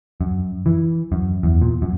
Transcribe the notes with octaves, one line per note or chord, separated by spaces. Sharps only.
F#2
E3
F#2
E2
A#2
F#2